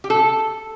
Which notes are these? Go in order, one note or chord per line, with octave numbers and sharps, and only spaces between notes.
G4
A4